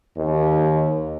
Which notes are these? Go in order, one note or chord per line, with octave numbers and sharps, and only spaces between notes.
D#2